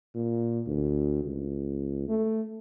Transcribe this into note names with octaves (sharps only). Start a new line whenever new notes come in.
A#2
D2
C#2
A3